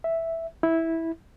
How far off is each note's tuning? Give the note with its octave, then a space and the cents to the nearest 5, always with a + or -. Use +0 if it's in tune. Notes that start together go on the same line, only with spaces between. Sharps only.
E5 +0
E4 -10